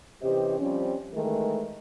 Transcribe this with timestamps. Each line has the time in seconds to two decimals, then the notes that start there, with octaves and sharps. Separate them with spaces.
0.22 C3 E3 C#4 G4 C5 D#5
0.59 F3 G3 C4 C#4
1.14 D#3 E3 G#3 A3 A#4